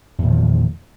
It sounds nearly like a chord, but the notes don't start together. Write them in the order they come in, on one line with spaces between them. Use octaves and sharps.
E2 A#2 D#3 F3